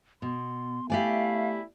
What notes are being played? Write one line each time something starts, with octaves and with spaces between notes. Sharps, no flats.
B2 C6
A3 E4 G4 D5 F5 G#5